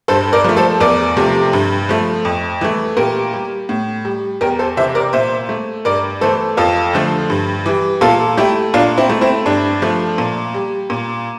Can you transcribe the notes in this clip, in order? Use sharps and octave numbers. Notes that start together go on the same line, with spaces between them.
G2 A4 C5
A#4 D5
F3 A3
A4 C5
E2 A#4 D5
C3 F3 A3
G2
F3 A3
F2
E3 A3
A#2 G4 A#4
G3
A2
G3
E2 G4 A#4
A4 C5
C3 E3 C5 E5
A#4 D5
A#2 C5 E5
A3
G2 A#4 D5
E3 A3 A4 C5
F2 F4 A4
D3 F3 A3
G2
E3 G3
A#2 F4 A4
A3 E4 G4
A#2 D4 F4
C4 E4
A3
C4 E4
G2 D4
F3 A3
A#2
G3
A#2